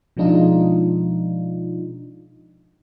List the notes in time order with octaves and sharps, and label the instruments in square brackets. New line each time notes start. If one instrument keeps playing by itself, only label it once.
[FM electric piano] B2 F3 G#3 D4 D#4 F4